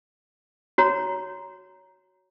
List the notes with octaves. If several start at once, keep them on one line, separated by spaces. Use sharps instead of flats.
F#4 C#5 A#5